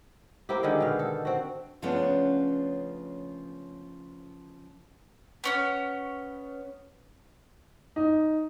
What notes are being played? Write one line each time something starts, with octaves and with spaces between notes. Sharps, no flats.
A#3 C4 E4 G4
D3 D#3 G#3 G4
B2 F5
A4
C4 F#4
C#3 F3 A3 B3 C#4 D4
B3 C#4 C#5
D#4